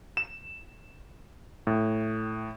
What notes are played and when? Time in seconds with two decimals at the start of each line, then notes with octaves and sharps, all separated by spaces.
0.17 E7
1.67 A2